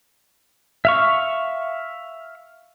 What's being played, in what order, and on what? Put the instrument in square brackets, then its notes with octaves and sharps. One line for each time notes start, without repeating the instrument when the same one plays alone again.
[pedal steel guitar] E5 F5 C#6